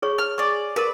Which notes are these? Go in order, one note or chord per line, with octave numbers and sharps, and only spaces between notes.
G#4 C#5 C#6
F6
G#4 D5 C#6
G4 A#4 B4 D5